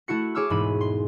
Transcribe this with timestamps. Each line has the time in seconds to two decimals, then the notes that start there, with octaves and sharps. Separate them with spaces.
0.08 A3 E4 F#4 C#7
0.35 G#4 C#5 D6 E6 F6
0.50 E1 G#2 B5 D#7
0.81 C6